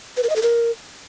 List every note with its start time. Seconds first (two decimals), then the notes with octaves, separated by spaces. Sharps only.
0.17 B4
0.23 A#4
0.29 D#5
0.36 A4
0.42 A#4